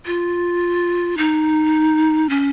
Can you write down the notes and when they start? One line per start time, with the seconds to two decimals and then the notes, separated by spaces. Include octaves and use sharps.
0.06 F4
1.18 D#4
2.29 C#4